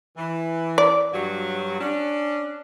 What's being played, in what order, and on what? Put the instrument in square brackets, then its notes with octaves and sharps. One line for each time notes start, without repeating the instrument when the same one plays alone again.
[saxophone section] E3
[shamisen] D5
[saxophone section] G2 F#3
C#4 D4